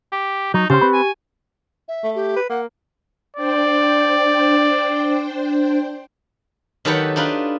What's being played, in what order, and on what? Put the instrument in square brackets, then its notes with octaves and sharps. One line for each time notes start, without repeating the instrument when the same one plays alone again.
[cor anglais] G4
[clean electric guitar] F#3 [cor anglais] D#4
[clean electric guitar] C#3 C#4 C6 [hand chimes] G4 [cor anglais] C5
[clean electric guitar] C4 B4 B5
[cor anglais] G#5
[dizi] E5
[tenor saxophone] A3
[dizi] G4
[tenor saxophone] B4
[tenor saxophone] A#3 [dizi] F#5
[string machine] D4 C5 G5 [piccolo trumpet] D5
[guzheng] D#3 F#3 G4 A4 B4 F#5
D4 D#4 F4 B4